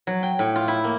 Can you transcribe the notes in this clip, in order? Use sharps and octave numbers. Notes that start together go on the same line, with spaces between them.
F#3
G5
A2
F4
E4
A#3